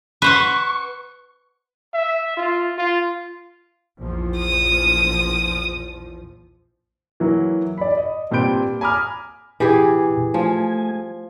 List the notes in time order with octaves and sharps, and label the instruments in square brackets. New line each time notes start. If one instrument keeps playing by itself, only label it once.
[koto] B4 C5 F#5 [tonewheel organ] C#6
[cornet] E5
F4
F4
[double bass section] A#1 E2 F3
[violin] D#6
[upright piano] E3 F#3 A#3
D5 B5
D#5
G2 A#2 C4 B5 G6 D7
G#5 A#5 B5 D6 D#6 F6
[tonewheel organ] A#2 [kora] E3 G4 G#4
[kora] F3 [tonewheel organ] A3 G#5